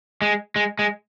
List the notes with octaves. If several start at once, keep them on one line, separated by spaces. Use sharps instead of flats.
G#3
G#3
G#3